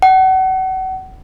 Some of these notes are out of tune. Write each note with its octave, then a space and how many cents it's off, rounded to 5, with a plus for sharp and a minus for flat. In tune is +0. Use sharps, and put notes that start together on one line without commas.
F#5 +35